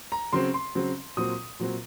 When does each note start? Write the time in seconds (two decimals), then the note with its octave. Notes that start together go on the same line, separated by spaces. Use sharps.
0.12 A#5
0.33 C#3 F#3 C4 C6
0.54 C6
0.75 C#3 F#3 C4
1.17 A#2 F#3 C4 D#6
1.59 A#2 F#3 C4